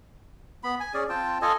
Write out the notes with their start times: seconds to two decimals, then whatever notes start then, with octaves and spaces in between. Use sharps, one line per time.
0.64 B3 B5
0.80 G#5
0.94 C#4 G#4 D5
1.09 C4 F4 G5 A5
1.42 F4 A4 D#5 G#5